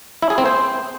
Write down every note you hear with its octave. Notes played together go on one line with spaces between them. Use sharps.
E4
G#4
C4
C5